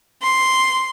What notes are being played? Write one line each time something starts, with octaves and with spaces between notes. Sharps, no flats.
C6